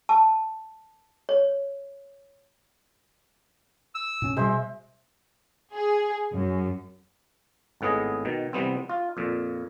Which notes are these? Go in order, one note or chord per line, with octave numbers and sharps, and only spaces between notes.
A5
C#5
E6
A2 C#4
B2 G3 G#3 C5 E5
G#4
F#2
G#1 A2 B3 G#4 D#5
B2 D#3
C3 E3 G3 B3 C4
F4
F2 A#2